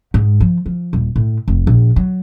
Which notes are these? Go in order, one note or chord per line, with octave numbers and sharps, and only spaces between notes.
G#2
F3
F3
D#1
A2
F1
A#1
F#3